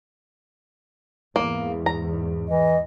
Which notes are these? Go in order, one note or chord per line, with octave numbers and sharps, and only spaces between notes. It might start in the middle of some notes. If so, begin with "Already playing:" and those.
E2 G#2 A#3
A#5
E3 D#5